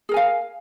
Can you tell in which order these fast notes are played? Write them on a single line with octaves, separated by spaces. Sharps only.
G#4 A#4 G#5 F5